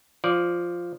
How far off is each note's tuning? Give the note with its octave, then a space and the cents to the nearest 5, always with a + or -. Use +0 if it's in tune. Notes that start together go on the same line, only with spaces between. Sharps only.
F3 +0 D5 -10